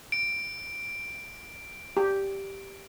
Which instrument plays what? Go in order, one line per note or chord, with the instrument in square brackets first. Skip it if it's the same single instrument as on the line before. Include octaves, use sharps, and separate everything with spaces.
[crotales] D7
[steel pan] G4